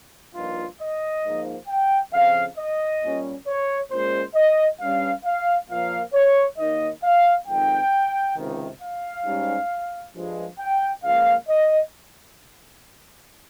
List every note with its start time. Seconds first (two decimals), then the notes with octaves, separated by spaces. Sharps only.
0.34 G2 F3 A#3 D#4 F4
0.80 D#5
1.24 G#2 F3 A#3
1.68 G5
2.13 F2 C#3 F3 C4 F5
2.57 D#5
3.02 A#2 G3 C#4
3.47 C#5
3.91 A#2 G#3 C#4 C5
4.35 D#5
4.80 G2 G3 C#4 F5
5.25 F5
5.69 A#2 F3 A#3 F5
6.14 C#5
6.58 D#2 D#3 A#3 D#4 D#5
7.03 F5
7.47 F2 D#3 G#3 C4 D#4 G5
8.36 C#2 C3 D#3
8.81 F5
9.26 G#2 G3 C#4
10.14 G2 F3 G#3
10.59 G5
11.04 C#2 C#3 F3 A#3 F5
11.48 D#5